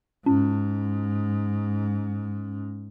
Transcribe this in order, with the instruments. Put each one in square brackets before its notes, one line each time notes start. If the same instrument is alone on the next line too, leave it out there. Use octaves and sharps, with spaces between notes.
[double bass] G#2 [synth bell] C#4